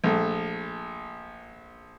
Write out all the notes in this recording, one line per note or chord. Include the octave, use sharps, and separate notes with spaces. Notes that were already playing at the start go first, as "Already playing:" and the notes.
A#1 A3